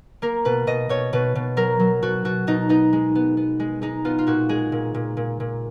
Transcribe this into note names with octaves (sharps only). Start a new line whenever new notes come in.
A#3 A#4
B2 B4
B2 D#5
B2 C#5
B2 B4
B2
F#3 A#4
F#3
B2 F#4
B2 F#4
B2 D#4
B3 D#4
G#3
B3
B3
G#3
G#3 D#4
B3 F4
F4
A#2 F#4
G#3 G#4
A#2
A#2
A#2
A#2